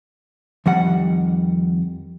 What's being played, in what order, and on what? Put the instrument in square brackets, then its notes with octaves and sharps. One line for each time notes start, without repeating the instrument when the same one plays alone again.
[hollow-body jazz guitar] F2 D#3 G3 F#5